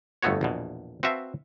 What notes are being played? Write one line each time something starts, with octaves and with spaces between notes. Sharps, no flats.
G1 F2 A3 B3 F#4 C#5
A#1 E2 B2
C4 F#4 B4 E5 F5 A5